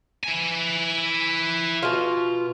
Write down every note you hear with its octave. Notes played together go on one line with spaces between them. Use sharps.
E4 G#5
B2 F4